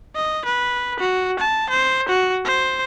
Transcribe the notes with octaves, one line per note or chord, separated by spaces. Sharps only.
D#5
B4
F#4
A5
C5
F#4
C5